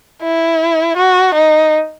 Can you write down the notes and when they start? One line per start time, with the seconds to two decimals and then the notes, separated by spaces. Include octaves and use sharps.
0.23 E4
0.97 F#4
1.34 D#4